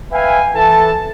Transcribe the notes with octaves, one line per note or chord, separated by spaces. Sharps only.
B4 E5 F5 G5 G#5
E3 A4 A5